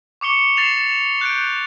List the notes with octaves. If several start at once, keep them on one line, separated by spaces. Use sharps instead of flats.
C#6 D6 C#7 G7
A6 C7 E7 F7
F#6 G6 D7